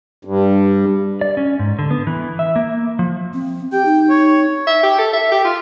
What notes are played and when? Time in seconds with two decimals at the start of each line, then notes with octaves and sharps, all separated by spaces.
0.25 G2
1.21 D5
1.37 C#4
1.59 G#2
1.79 D3
1.91 B3
2.07 E3
2.39 E5
2.56 A#3
2.99 F3
3.34 C4
3.72 G4 G5
3.86 D#4
4.10 C#5
4.67 E5
4.83 G4
4.98 A4
5.13 E5
5.32 G4
5.44 F4